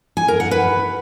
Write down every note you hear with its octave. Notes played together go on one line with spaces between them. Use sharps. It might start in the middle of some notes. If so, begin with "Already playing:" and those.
G#5
A#4
F#5
B4